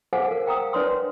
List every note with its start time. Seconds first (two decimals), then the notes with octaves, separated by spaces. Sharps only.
0.13 G#4 A4 C5 F5 F#5 G#5
0.31 A#4
0.46 F5 G5 A#5 D#6
0.73 D4 B4 C#5 D5 C6 D#6